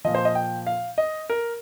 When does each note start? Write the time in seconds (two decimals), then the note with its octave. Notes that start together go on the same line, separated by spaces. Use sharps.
0.05 A#2 F3 D#5
0.15 C5
0.25 D#5
0.35 G5
0.67 F5
0.98 D#5
1.30 A#4